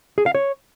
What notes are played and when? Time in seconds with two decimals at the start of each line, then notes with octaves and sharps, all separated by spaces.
0.18 G#4
0.26 F5
0.35 C#5